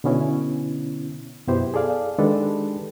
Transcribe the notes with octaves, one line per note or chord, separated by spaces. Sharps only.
B2 D3 B3 C#4 E4
F#2 B2 B3 E4 G4 C5
G#4 A4 D5 F5
D#3 G#3 D4 G4 A4 B4